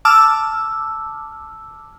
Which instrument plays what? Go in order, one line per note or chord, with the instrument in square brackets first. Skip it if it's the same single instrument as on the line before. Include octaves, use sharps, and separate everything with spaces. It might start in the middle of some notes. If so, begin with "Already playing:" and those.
[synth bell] A5 D6 E6 F6